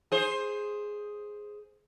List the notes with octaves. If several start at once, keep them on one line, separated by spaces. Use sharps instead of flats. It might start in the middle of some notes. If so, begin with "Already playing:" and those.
G#4 C5